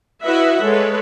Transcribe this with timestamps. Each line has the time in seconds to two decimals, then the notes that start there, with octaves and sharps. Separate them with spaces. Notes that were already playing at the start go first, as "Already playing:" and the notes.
0.23 E4 F#4 B4 D#5 E5 F#5
0.63 G#3 A4 B4 C#5